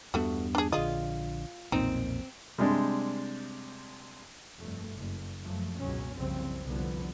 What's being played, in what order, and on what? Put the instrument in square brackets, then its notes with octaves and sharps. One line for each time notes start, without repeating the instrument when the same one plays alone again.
[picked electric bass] E2 G2 B3 [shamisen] A3 F#4
[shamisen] D4 G#4
[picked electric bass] A#1 D3 [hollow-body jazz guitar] F4 [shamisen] G#4 D#5
[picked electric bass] B1 F2 A#2 [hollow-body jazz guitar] C4 [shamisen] D#4
[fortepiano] C3 G3 G#3 D4
[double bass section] F1 G2 A3
F#1
F#2 F3 F#3 A3
G#1 C#2 F#2 B2 F#3 C#4
F#1 C2 C#3 F3 C4
C2 F2 D3 F3 B3